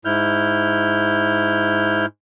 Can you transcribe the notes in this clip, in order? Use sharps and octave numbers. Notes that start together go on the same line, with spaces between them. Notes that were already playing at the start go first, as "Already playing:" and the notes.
G#2 E4 F6 G6